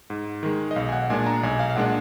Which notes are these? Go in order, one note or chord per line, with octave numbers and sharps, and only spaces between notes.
G#2
D#3 G#3
D#5
B1 F5
G#5
F#5
A#2 G#3 D4 G#5
A#5
B1 G#5
F5
F5
A#2 G#3 D4 F#5